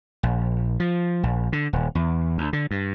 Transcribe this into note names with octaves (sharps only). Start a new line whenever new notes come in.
A#1
F3
A#1
D3
D#1
E2
D2
D3
G2